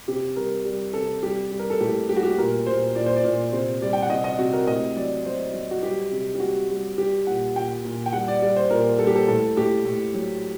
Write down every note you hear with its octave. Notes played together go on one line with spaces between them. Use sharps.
C3 G4
G3 A#4
G3
C3 A4
G3 G4
G3
A#4
A4
A2 G4
G3 G4
F#4
G4
A#2 A#4
A#2 C5
A#2 D5
C5
D5
A#2
C3 C5
G3 D5
G5
F#5
C3 D#5
D#5
C3 F#4
A#4
A2 D#5
F#3 D5
F#3 C5
F#3
F#4
G3 G4
C3
G4
G3 F#4
G3
G3 G4
A#2 F#5
A#2 G5
A#2
G5
G3 F#5
D5
G3 D5
C5
A#2 A#4
G3 A4
G4
A4
A2 A4
A2 G4
A2
F#3